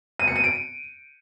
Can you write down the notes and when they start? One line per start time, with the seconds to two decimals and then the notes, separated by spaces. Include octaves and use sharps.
0.20 D#7
0.28 C#7
0.36 D#7
0.44 D7